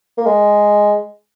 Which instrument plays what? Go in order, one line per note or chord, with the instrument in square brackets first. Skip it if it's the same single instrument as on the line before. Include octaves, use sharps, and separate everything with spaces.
[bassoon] A#3
G#3